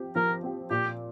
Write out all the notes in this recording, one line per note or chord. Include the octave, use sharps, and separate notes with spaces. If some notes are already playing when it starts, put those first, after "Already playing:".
Already playing: F3 C4 G4
F3 A#4
C4 G4
A#2 G4